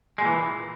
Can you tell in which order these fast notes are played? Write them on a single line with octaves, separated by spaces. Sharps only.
G#3 A#2 E3